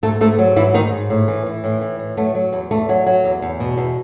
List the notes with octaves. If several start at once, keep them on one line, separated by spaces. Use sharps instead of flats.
G#2 A3 A4
G#2 A3 A4
F#3
G#2 E3 E4
G#2 D#3 D#4
G#2
A2
E3
E3
A2
E3
A2
F#3 A3
F#3
E2
E2 A3
F#3
F#3
E2
E2
B2
E2